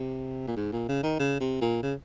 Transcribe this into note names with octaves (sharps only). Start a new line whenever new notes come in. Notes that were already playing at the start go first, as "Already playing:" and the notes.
Already playing: C3
A#2
G#2
A#2
C#3
D#3
C#3
C3
A#2
C#3